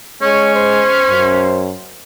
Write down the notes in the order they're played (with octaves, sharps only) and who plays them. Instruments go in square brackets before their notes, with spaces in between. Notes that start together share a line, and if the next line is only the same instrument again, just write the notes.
[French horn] G#3 [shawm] C#4 [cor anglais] C#5
[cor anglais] C5
[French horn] F#2